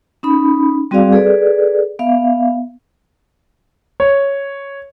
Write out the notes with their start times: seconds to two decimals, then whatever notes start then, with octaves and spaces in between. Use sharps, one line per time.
0.23 C#4 D#4 B5
0.91 G3 C4 F#4 G#4 D5 F5
1.12 G#4 A4 B4 D5
1.99 B3 E5 F5
4.00 C#5